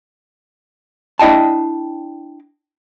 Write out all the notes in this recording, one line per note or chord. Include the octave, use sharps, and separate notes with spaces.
D4 E4 D#5 G5 A5